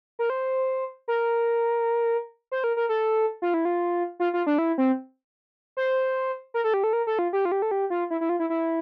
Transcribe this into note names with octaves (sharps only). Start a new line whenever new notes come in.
A#4
C5
A#4
C5
A#4
A#4
A4
F4
E4
F4
F4
F4
D4
E4
C4
C5
A#4
A4
G4
A4
A#4
A4
F4
G4
F4
G4
A4
G4
F4
E4
E4
F4
E4
E4